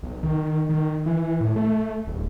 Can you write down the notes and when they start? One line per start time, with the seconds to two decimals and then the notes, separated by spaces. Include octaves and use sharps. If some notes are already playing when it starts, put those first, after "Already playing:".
0.03 B1
0.23 D#3
0.69 D#3
1.06 E3
1.40 A2
1.56 A3
2.07 D#1